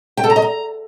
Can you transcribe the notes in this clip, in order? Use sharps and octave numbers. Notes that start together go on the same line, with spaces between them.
G5
A4
A#5
D#5
A#5